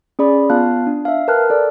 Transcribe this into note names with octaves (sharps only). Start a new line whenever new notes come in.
C#4 G#4 D5 B5
B3 F4 F5 A5 F#6
D4
E5 F5
A#4 B4 G5 A5 F6 F#6
A4 D5